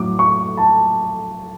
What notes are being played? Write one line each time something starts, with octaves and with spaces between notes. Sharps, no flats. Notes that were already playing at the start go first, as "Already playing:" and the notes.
Already playing: A2 F#3 A3 D6
C#6
A5